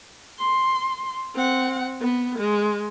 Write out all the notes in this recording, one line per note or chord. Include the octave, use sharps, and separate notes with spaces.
C6
C4 F#5
B3
G#3